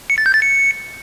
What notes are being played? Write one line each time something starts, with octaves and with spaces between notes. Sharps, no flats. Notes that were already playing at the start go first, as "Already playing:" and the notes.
C#7
A6
G6
A6
C#7